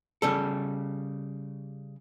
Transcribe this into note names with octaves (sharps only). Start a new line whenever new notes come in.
C#3 G3 A4